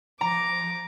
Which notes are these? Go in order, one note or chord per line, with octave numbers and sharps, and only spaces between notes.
F3 A#5 D6